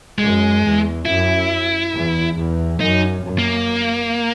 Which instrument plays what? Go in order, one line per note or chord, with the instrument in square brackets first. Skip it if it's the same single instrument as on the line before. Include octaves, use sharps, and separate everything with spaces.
[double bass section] F#2 [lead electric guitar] G#3
[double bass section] E2
[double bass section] F#2 [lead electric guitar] E4
[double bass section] E2
E2
[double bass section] F#2 [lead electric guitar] D#4
[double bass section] F#2
[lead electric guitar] A#3